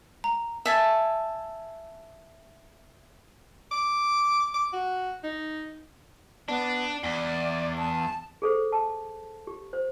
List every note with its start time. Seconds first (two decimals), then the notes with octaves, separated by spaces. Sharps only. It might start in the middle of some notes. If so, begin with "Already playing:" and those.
0.24 A#5
0.66 E5 G#5 A5
3.71 D6
4.54 D6
4.73 F#4
5.24 D#4
6.48 B3 D4
7.03 E2 D5
7.77 A5
8.42 G#4 A4 C5
8.72 A5
9.47 G4
9.73 C5